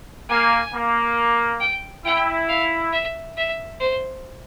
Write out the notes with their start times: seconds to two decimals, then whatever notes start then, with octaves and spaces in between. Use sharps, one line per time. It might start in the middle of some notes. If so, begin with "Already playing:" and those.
0.29 A#3 G#5
0.73 A#3
1.60 G5
2.05 E4 G5
2.49 F5
2.93 E5
3.37 E5
3.80 C5